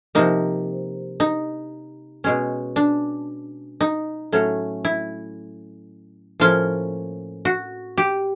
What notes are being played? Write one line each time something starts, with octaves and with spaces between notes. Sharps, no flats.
C3 F3 A#3 D#4
D#4
B2 G#3 C#4
D4
D#4
A2 F#3 A3 C#4
E4
A2 F3 A#3 C#4 F4
F#4
G4